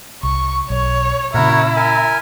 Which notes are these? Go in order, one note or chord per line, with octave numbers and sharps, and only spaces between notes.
C2 C#6
B1 C#5
A#2 C#3 E4 F#4 A#4 C#5
A#4 E5 G#5